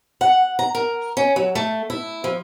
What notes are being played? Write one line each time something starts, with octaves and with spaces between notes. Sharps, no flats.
F#5
A#5
A#4
C#4
F#3
A3
E4
F3